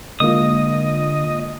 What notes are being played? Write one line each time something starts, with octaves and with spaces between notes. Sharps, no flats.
D3 G#3 A#3 F4 D#5 D#6